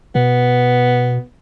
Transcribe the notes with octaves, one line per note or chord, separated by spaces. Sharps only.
B2 B3